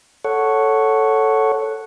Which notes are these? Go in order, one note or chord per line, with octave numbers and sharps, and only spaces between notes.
A4 C#5 F#5